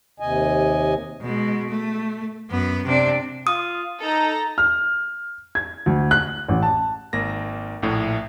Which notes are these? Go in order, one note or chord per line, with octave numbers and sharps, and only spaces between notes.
D#2 C3 D#5 G#5
B2 G#3
A3
F#2 B3
C3 D4
F4 D#6
D#4 A4 A#5
F6
G#6
D2
F#6
A1
A5
G#1 A#3 A#6
A#1 A2